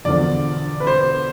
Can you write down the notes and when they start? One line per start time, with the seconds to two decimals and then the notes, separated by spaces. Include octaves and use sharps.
0.04 E1 E2 D3 F3 D5
0.80 B4
0.87 C5